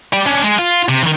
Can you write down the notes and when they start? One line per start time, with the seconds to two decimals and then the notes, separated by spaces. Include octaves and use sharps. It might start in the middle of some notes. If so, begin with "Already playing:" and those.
0.13 G4 D5
0.26 C#4 D4
0.43 G#3
0.59 F4
0.89 C3
1.03 D#3 E3